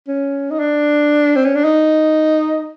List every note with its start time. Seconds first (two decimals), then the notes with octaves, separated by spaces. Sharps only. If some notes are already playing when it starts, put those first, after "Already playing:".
0.08 C#4
0.51 D#4
0.60 D4
1.36 C4
1.45 C#4
1.55 D4
1.65 D#4